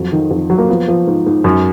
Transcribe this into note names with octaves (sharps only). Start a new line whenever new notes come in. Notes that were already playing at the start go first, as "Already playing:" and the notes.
Already playing: F2 F#3
D#3
F2
F#3
A#3
F3 B3
F3
G#2
G#2
F#2